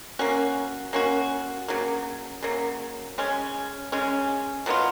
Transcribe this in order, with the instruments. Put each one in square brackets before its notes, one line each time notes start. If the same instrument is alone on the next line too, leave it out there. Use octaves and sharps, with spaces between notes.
[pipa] A#3 C#4 F#4
A#3 C#4 F#4
C#3 F#3 A#3
C#3 F#3 A#3
C#3 G#3 C#4
C#3 G#3 C#4
B2 F#3 B3 F4